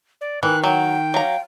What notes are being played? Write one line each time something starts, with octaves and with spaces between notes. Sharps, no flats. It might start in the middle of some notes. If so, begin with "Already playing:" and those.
D5
D#3 E3 F#6
F#3 F#5 G5
F#3 F5 A#5